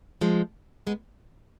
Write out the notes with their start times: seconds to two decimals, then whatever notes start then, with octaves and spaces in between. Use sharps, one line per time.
0.21 F3 G#3
0.87 G#3 B3